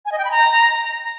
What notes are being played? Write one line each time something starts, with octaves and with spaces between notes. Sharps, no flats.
G#5
D#5
G5
B5
A#5